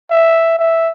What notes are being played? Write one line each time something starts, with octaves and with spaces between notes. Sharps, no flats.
E5
E5